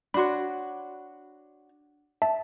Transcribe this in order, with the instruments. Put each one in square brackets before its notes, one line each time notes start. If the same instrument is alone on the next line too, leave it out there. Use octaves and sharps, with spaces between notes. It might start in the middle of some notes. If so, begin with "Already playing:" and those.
[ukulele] D4 F#4 C#5 [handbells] B5 C6
[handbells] E5 A5